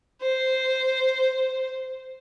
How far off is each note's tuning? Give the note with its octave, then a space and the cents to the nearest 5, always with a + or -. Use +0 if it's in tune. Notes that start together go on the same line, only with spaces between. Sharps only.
C5 -5